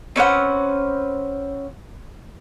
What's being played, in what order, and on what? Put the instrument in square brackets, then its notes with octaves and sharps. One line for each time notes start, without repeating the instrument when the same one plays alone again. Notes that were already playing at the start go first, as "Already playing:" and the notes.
[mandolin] C4 C#4 B4 F#5